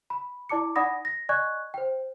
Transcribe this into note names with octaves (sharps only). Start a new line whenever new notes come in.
B5
E4 D5 A5 D6 C#7
D#4 D5 F#5 B5 D#6 A#6
A#6
D5 D#5 G#5 C#6 F#6 G#6
C5 G5